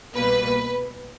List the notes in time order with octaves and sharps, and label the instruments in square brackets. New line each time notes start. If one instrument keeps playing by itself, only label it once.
[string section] C2 B2 G3 A#3 B4